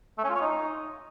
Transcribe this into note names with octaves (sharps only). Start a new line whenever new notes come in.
A3
C#4
F4
C#5
D#4